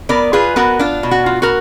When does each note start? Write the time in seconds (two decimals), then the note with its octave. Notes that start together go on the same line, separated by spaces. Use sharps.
0.09 B3 A#4 D5
0.33 F4 G#4 B4
0.56 B3 F#4 A#4
0.79 D4 F4
1.03 B2
1.11 F#4
1.26 F4
1.42 F#4 A#4